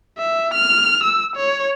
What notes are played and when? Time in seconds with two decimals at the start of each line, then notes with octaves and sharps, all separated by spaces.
0.18 E5
0.54 F6
1.04 E6
1.36 C#5